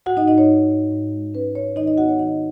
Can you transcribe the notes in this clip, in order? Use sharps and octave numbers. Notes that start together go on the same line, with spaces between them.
G#2 F#4 F#5
D#4 D#5
G#2 D#4 D#5
C#5
G#2
G#2
G#2
G#3
C#4 B4
C#4 C#5
D#3 D#4 D#5
D#4 D#5
B3 F#4 F#5
C#5
D#3 D#4 D#5